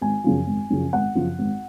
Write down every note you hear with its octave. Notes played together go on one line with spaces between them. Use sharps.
G#1 G#5
F#2 C#3 F3
G#1
F#2 C#3 F3
G#1 F#5
F#2 C#3 F3
G#1